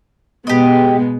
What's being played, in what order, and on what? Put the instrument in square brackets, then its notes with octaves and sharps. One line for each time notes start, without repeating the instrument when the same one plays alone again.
[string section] B2 G#3 B3 [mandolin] G4 D#5